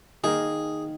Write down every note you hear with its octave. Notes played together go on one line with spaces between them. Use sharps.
D#3 A#3 G#4 A#4